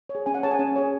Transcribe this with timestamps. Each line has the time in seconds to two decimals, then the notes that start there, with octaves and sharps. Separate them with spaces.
0.09 C#5
0.15 G#4
0.26 C#4 G#5
0.34 F#5
0.43 G#4 C#5 A5
0.51 G#5
0.59 C#4
0.76 G#4 C#5